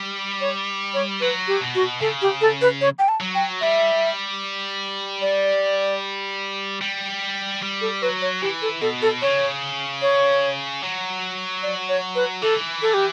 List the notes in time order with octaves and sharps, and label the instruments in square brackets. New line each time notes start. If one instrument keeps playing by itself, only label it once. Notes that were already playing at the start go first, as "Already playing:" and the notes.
Already playing: [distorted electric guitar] G3
[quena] C#5
C#5
[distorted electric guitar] F#3 [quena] B4
[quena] G4
[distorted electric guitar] B2
[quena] F#4
[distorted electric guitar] C#3 [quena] A4
[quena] G4
A4
B4
C#5
G5
A5
[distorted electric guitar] F#3
[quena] G5
[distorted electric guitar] G3 [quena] E5
[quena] D5
[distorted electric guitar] G3
G3
[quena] A4
[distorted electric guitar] F#3 [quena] B4
[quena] C#5
[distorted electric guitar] E3 [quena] G4
[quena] A4
[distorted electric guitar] B2 [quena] A4
[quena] A4
[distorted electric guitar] C#3 [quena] C#5
[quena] C#5
[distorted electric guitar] F#3
[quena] D5
C#5
B4
[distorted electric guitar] E3 [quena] A4
[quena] A4
G4